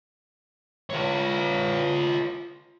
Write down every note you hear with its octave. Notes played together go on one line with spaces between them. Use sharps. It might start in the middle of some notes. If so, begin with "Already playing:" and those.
F4 C#5